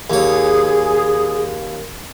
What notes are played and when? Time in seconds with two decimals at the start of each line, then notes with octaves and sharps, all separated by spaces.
0.10 D#2 G#4 C#5